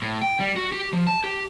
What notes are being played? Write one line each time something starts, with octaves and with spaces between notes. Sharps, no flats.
A2
G5
G3
F#4
G4
F3
A5
G4